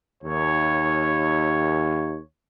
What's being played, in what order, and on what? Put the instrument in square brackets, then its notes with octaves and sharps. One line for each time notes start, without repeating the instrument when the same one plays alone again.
[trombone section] D#2 [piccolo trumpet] C#5